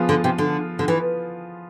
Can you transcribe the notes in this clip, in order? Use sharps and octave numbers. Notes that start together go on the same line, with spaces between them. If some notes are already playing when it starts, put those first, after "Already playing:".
Already playing: F3 B3 F4 G#4
D3
C3
D3
D3
E3